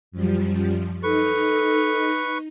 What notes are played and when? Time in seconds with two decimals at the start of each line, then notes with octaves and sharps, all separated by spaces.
0.12 F#2 F3 G3
1.03 D#4 A4 B4 C#6